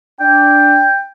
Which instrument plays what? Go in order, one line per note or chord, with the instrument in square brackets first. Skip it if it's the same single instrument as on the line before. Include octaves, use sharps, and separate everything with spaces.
[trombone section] D4 [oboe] G5